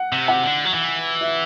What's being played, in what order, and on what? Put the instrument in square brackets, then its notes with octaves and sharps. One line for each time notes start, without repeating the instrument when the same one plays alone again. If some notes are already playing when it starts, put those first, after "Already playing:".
Already playing: [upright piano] F#5
[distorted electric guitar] C3
[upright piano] F#5
[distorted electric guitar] D3
F#3
E3
[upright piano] E5